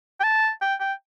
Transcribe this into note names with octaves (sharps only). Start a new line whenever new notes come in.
G5
A5
G5
G5